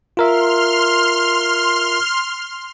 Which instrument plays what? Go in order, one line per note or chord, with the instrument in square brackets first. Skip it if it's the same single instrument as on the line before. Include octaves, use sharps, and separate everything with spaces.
[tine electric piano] F4 A#4 E5 [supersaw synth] C6 F6